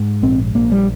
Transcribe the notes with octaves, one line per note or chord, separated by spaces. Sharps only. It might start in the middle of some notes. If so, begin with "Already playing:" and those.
Already playing: G#2
A#1 C4
A#1 A#3
G3